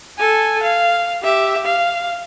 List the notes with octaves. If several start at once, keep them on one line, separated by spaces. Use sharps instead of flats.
A4 G#5
F5
G4 E5
F5